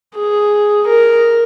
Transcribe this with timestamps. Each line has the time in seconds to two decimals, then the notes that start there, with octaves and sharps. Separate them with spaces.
0.15 G#4
0.87 A#4